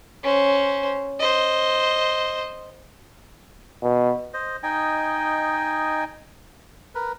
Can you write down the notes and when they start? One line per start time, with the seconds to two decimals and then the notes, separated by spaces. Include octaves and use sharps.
0.23 C#4 C5
1.20 C5 D#5
3.83 B2
4.34 C5 D#5
4.63 D#4 D#5 G5 G#5
6.95 A#4 B4